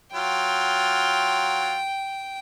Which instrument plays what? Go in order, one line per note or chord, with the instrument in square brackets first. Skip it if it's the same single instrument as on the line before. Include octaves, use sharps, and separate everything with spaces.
[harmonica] F#3 F4 [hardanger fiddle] G5